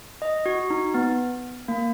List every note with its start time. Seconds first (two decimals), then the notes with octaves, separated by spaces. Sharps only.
0.22 D#5
0.46 F#4
0.70 D#4
0.94 B3
1.68 A#3